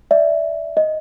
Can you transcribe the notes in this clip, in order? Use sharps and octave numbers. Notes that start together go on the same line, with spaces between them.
D5 E5
D#5